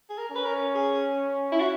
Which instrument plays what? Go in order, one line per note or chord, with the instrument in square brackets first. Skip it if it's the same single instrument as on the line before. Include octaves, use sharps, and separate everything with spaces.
[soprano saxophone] G#4
A#4
[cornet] C#4 [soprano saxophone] B4
[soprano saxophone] A#4
G#4
E4
F#4